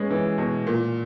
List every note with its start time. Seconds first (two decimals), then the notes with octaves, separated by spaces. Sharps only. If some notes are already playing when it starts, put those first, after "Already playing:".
Already playing: G#3 B3 C#4
0.10 E3
0.38 B2
0.67 A#2